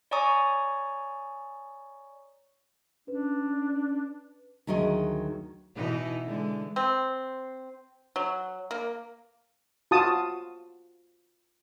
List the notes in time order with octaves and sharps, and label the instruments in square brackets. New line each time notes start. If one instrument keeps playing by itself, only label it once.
[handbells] C#5 D5 G#5 A#5 C#6 D#6
[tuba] C#4 [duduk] D4 [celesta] B4
[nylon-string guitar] D2 D#3 F#3 G#4 D#5
[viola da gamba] B2 E3 D#4
D3 E3 G#3
[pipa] C4
F#3
A#3
[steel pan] F4 F#4 A5 D#6